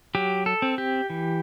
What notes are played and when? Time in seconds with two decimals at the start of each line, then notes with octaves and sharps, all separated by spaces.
0.15 F#3 G4
0.46 A4
0.62 C4
0.78 G4
1.10 E3